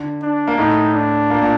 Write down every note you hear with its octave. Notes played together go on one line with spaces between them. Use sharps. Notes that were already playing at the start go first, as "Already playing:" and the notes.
Already playing: D3
D4
A#3
A2 A3 D#4
D4
A#2 A#3
A#2 A#3